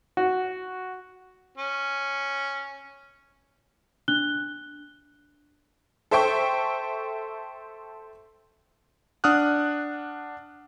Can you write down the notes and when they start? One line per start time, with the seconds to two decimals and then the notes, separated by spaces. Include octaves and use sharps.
0.17 F#4
1.58 C#4
4.08 D4 F#6 G7
6.11 A4 C5 E5 G5 C#6
9.24 D4 F#5 D#6 F6 F#6